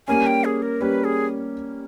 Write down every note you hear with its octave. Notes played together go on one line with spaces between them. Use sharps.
G3 A#3 C#4 G#5
G5
G#4
A#4
G3 A#3 C#4 B4
G#4